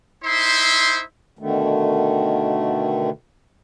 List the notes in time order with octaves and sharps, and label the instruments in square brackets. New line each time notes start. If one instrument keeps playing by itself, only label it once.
[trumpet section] D#4 E4 C5 E5 C6
[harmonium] B2 D3 D#3 A3